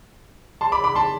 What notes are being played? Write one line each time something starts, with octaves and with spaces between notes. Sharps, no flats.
A5 C6
B5 D6
B5 D6
A5 C6